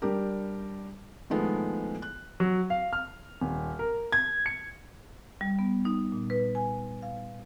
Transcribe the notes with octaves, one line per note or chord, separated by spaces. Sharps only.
G3 D4 G4 A#4
A2 D#3 F3 G#3 A3 B3
F#6
F#3
F5
F6
D#1
A#4
G#6
C#7
G3
B3
D#4
A#2
B4
G#5
F5